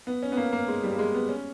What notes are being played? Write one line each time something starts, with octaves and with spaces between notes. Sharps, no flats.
B3
C#4
B3
A#3
A#3
G#3
G3
A#3
G#3
B3
C#4